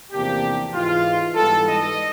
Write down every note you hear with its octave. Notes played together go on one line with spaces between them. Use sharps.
E2 C3 F3 A#3 D4 G4
G#2 E3 G#3 F4
G#2 E3 G3 B3 A4
D#5